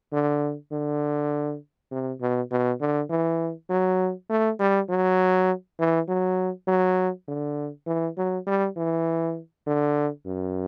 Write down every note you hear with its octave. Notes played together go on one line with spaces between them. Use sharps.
D3
D3
C3
B2
B2
D3
E3
F#3
A3
G3
F#3
E3
F#3
F#3
D3
E3
F#3
G3
E3
D3
F#2